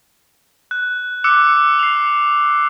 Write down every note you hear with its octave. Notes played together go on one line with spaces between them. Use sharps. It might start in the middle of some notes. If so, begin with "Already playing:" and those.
F#6
D6 E6 F#6 C#7
C7 F7